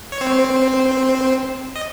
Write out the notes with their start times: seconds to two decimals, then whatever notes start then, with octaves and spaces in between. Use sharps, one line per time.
0.12 C#5
0.21 C4 C5
1.76 D#5